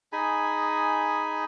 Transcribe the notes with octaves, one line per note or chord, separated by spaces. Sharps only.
D#4 G#4 G#5 B5